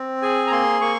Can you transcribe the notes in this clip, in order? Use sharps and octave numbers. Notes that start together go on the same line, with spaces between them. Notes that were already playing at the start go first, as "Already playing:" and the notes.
Already playing: C4
G#4 G#5
A#5
A#3 C6
A#3 C#6